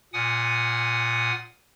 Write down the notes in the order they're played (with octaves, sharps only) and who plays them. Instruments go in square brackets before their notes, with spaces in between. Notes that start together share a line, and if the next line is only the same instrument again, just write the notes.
[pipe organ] A#2 F#5 G#5 D#6